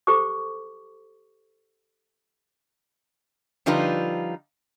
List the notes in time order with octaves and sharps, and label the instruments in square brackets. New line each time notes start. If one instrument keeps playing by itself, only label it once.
[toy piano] G4 A4 C5 C#6 D6
[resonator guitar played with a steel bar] D3 F3 G3 D#4 F4 B4